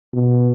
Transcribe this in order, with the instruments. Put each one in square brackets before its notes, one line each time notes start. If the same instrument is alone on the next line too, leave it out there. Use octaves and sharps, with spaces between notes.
[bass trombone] B2